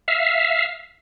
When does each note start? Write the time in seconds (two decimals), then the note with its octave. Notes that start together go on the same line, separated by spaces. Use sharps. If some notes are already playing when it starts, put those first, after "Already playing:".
0.08 E5 F5